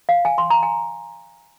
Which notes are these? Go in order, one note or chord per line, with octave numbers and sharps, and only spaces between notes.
F5
G#5
C6
A#5
G#5